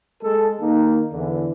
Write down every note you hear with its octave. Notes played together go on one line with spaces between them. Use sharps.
G#3 A4
D#3 A#3 D#4
E2 D3 E3